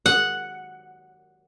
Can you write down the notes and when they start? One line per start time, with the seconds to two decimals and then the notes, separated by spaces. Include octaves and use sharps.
0.06 F#5